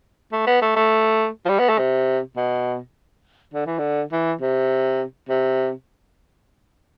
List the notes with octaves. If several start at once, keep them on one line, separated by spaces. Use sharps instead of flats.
A3
B3
A3
A3
F3
G3
B3
A3
C3
B2
D3
E3
D3
E3
C3
C3